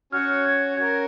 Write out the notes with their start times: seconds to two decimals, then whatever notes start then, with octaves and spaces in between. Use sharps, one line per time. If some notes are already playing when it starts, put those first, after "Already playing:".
0.12 C#4 F#4 C#5 F6
0.28 F6
0.45 G#6
0.77 C#4 F#4 A#4 G#6